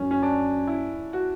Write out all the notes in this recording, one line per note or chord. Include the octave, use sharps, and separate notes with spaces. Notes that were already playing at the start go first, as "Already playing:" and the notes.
Already playing: F#2 C#4
C#4
D4
E4
F#4